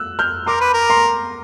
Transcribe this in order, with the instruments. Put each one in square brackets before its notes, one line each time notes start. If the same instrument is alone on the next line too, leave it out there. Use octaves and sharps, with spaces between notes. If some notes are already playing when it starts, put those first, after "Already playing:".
Already playing: [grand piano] E6 F#6
F6 G6
[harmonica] A#4 [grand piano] C6 D6
[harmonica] B4
A#4
[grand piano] A#5 C6